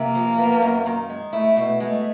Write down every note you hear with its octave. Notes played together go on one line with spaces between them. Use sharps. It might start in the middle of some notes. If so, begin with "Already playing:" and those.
Already playing: C3 A#3
F3
B3
F#2
D#3
G#3
A3 E4
B2
G#3 A3